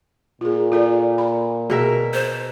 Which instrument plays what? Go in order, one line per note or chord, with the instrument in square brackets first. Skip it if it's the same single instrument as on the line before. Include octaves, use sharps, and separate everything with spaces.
[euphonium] A#2 [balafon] F4 G#4
[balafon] F4 A4 D5
B5
[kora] B2 A#4 E5 [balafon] G#4
[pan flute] C5